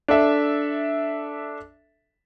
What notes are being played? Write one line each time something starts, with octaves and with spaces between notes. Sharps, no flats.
D4 A4 E5